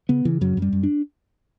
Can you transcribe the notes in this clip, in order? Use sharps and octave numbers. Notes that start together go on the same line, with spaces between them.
C#3 B3
C#3 E3
F#2 F#3
F#2
G3
F#2
D4